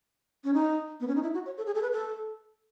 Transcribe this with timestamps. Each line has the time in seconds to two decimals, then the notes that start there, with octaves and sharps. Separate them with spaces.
0.44 C#4
0.54 D#4
1.00 B3
1.08 C#4
1.16 D#4
1.23 E4
1.34 F#4
1.46 C#5
1.57 A4
1.66 G#4
1.75 A4
1.82 B4
1.92 A4